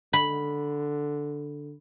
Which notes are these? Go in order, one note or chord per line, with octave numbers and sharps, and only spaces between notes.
D3 B5